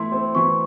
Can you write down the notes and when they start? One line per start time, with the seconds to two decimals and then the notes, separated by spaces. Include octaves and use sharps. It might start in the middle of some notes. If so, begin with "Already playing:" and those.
Already playing: E3 A3 E4 C6
0.12 C4
0.35 E3 C#6